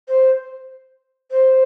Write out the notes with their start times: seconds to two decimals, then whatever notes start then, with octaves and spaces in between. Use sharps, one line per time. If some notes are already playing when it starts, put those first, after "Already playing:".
0.08 C5
1.31 C5